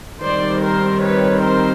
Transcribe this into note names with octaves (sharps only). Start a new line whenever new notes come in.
D#3 G3 C4 C5 D5
A#4 C5
B4 C#5
A#4 C5